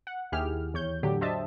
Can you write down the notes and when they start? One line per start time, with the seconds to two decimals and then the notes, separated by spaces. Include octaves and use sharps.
0.07 F#5
0.32 D#2 E4 G4 G#4 F6
0.74 E2 C#5 G6
1.03 A2 D3 F#3 G4
1.21 D4 C5 D#5 E5 A5